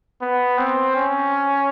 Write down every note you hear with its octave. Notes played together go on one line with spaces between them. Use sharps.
B3
C4
C#4